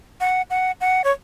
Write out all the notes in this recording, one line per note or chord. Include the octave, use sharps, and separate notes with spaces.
F#5
F#5
F#5
C#5